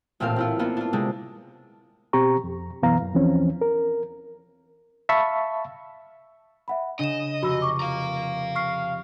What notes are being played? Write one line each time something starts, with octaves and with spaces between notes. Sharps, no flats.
A1 A#2 A3 C4 F5
C4 E4 F4
A#3 B3 D4 F4
D4 F4
C3 G#3 D4
B2 C4 G4 A#5 C#6
F2
F#2 B2 E3 B3 F5 A#5
F#2
E2 E3 F3 C4 C#4
A#4
E5 F5 A5 B5 C#6
E5 F#5 B5
C#3 D4 D#5 E7
F1 F#4 B5 E6
C#6 D6
F5 A#5
C#6 F6 C7